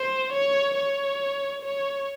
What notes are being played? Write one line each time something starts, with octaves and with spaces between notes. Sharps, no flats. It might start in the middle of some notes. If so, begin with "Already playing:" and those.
Already playing: C5
C#5
C#5
C#5